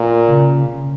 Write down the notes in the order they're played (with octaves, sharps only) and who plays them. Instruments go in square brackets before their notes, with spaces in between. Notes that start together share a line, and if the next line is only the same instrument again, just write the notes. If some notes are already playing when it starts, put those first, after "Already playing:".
Already playing: [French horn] A#2
[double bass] C#3